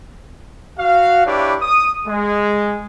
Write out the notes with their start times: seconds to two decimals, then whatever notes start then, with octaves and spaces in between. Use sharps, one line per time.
0.79 F#4 F5
1.26 D4 E4 G4 B4 C#5 D5
1.62 D#6
2.07 G#3